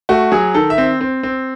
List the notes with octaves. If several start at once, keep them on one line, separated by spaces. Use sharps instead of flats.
A3 F#4
F#3 G#4
D#3 A4
E5
C4
C4
C4